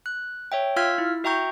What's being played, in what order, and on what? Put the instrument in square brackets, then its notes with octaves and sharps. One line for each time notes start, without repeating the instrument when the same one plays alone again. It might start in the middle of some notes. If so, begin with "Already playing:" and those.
[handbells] F#6
C#5 E5 G5
F4 F5 E6 F6 G#6 B6
E4
F#4 E5 G5 A#5 C#6 G6